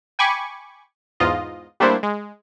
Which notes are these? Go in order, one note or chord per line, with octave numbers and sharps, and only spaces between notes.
G5 G#5 B5 C#6 D6
E2 G#2 F4 D#5
G3 A3 A#3 D4 E4 C5
G#3